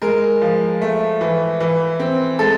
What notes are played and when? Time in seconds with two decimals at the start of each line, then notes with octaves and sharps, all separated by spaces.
0.02 G#3 A#4
0.41 F3
0.82 A3
1.21 E3
1.60 E3
2.00 C4
2.39 G#3 A4